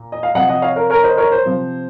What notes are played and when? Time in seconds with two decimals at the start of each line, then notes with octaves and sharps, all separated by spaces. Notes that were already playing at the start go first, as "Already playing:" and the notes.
Already playing: A#2
0.12 D#5
0.23 F5
0.35 C3 F3 D#5 F#5
0.49 D#5 F#5
0.62 C#5 F5
0.76 A#4 C#5
0.90 A#4 C#5
1.03 C5 D#5
1.17 A#4 C#5
1.32 C5
1.46 C3 F3